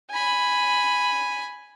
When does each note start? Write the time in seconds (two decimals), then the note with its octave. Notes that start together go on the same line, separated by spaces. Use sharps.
0.11 G#5 B5